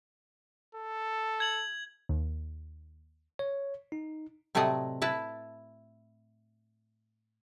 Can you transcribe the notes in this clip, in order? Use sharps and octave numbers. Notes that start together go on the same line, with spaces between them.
A4
G#6 F#7
D#2
C#5
D#4
A2 C3 F#3 A3 D5 D#5
E4 B4 A5